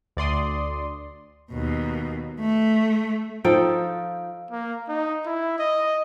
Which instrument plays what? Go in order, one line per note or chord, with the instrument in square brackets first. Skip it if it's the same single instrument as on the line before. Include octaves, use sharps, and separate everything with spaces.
[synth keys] D2 D5 C6 D#6
[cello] D#2 B2
A3
[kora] F3 D#4 A4 G5
[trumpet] A#3
D#4
E4
D#5